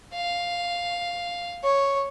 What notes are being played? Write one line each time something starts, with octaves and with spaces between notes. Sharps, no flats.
F5
C#5